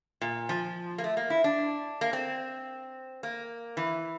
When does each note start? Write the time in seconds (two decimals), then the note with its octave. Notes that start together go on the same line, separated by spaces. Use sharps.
0.21 A#2
0.49 F3
0.98 A#3
1.04 A3
1.17 A#3
1.30 E4
1.44 D4
2.01 A#3
2.13 C4
3.23 A#3
3.77 E3